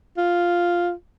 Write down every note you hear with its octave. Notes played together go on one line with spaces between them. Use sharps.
F4